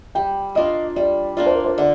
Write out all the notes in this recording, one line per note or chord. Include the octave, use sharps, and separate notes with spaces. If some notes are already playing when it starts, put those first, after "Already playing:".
G3 G5
A#3 D4 F4 D#5
G3 D5
A#3 D4 F4 D5
C5
A#4
C5
D3 D5